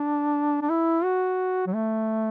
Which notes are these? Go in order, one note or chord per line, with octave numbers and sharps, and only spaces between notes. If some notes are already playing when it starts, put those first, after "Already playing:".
Already playing: D4
D4
E4
F#4
F#3
A3